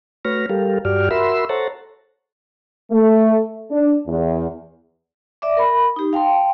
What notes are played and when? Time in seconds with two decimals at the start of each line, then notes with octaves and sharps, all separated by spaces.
0.25 A3 F#4 B4 C#5 F6 A#6
0.49 G3 G4 A4 A#4 F5
0.85 G2 F#4 G4 D5 F6
1.11 F#4 A#4 E5 B5 C6 E6
1.49 A4 C5 C#5 F#5 A5 A#5
2.91 A3
3.71 D4
4.07 E2
5.42 D5 E5 D6
5.57 A#4 B5
5.96 D#4 G4
6.13 F5 G5 A5 C6